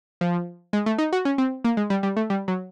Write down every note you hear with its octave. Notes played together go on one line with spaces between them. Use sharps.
F3
G#3
A3
D#4
F#4
C#4
C4
A#3
G#3
G3
G3
A3
G3
F#3